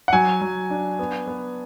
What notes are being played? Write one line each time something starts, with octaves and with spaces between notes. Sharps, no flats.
F#5
F#3 G#5
F#3
D4
B3
B3